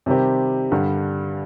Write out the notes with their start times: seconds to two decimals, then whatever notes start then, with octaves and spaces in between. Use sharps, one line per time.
0.06 C3 D#3 G3 C4 G4
0.71 G2 D3 G3